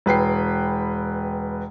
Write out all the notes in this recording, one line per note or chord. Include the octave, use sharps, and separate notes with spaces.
E1 B4 G5 C7